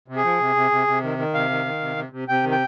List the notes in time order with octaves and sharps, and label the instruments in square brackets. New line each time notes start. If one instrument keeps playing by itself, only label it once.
[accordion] C3
G#4
F3
C3
C3
C3
C3
D#3
D#3
C3 F5
D#3
D#3
C3
C3
C3
C3 G5
D#3
G5